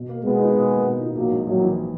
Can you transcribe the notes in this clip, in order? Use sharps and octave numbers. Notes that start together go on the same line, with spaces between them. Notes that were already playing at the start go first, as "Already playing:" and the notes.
Already playing: B2
A#3
B2 G#3 B3
D#4
B2
A#3
B2
D#4
A#1 F#3 A#3
G#2
A#1 F#3 A#3
E3